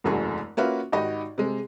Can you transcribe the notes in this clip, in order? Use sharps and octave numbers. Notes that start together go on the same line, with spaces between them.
E1 C2 F#2 A3 F#4 G#4
A#3 C#4 F4 F#4 B4 E5
G#1 D#4 F#4 G4 D#5 B5
C3 G#3